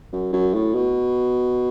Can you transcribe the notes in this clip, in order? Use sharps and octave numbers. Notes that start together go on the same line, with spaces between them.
F#2
F#2
A2
B2